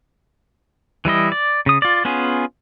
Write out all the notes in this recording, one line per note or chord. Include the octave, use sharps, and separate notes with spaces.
E3 G3 E4 D#5
D5
C#3 D#6
F4 D5
B3 C#4 F4 G#4